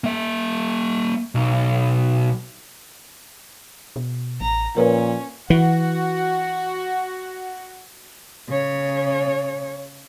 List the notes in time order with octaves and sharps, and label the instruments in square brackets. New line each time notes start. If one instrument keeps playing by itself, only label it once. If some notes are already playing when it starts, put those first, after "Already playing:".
[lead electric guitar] A#3 E5
B1
[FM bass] B2
[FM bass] A1 [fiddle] A#5
[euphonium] A#2 [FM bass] F3 [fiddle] C#4 [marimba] A#4 B4 C#5
[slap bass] E3 [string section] F#4
[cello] C#3 C#5